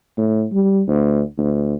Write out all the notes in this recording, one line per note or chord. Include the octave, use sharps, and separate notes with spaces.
A2
G3
D2
D2